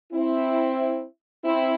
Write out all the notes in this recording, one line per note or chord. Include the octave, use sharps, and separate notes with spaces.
C4 E4
C4 E4